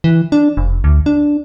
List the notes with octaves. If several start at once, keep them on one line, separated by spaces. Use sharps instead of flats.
E3
D4
F1
D2
D4